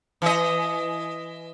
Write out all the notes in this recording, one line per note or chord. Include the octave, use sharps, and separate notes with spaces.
E3 D#5